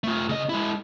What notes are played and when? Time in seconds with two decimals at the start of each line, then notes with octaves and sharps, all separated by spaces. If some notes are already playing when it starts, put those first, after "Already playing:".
0.04 A3 F4
0.29 C#3 D#5
0.49 G#3 E4